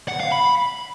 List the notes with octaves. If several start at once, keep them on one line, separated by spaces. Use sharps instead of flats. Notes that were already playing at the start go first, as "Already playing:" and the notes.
F#5
F5
B5